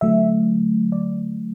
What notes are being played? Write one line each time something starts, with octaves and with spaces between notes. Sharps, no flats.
D3 F#3 A3 E5
D5